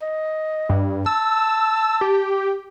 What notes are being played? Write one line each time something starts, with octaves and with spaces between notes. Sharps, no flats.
D#5
G2
A5 E6
G4